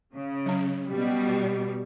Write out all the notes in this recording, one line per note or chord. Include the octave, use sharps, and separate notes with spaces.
C#3
F#3 C#4
B2 G3